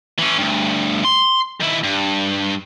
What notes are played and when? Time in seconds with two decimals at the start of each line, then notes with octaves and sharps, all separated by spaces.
0.19 E3 C#4
0.38 D2 G2
1.05 C6
1.60 D#3 E4
1.84 G2